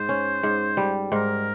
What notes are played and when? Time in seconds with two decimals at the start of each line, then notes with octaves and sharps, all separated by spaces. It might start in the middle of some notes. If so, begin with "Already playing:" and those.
Already playing: G#2 C5
0.09 C#4
0.43 G#2
0.77 G3
1.12 G#2 A#4